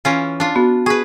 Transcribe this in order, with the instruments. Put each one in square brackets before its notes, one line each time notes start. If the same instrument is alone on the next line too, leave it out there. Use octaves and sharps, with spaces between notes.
[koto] E3 C#4 F4
D4 F4
[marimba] B3 F#4
[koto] G#4 B4 [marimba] C#6